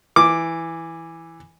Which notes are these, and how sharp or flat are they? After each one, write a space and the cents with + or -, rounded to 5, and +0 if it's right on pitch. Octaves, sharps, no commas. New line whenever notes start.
E3 +0 D6 +0